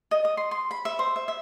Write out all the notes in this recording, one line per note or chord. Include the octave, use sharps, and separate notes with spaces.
D#5
D#6
C6
C6
B5
E5
C5
E5
E5